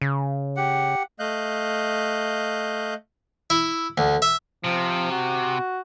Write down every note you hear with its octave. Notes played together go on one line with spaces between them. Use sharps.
C#3
G4 F#5
A3 D#5 F5 F#6 G6
E4
D2
E5
C3 F3
F#4